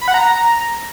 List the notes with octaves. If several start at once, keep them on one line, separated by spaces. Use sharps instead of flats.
B5
F#5
A#5